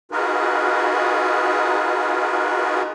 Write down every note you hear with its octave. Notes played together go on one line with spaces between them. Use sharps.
D#4 F4 F#4 G#4 A#4 B4